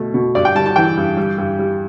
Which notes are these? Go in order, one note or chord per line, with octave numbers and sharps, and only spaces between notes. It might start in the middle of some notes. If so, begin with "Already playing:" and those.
Already playing: B2 A3
B2
G2 D5
G5
G3 A5
A5
E3 G5
G2
G3
G2
G3